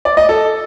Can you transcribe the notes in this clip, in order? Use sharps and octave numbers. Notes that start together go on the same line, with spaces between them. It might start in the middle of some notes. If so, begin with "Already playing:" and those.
D5
D#5
A4